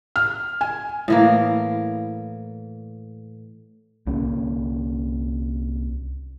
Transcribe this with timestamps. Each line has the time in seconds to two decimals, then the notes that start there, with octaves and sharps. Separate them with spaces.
0.16 F6
0.61 G#5
1.08 A2 E3 A#3
4.07 C2 A#3 C#4